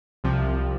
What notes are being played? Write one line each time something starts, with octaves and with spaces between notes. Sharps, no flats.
C2 C3 F3